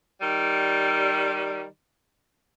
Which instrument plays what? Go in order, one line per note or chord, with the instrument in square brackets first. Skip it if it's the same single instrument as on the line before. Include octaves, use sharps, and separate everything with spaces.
[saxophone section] D#3 G3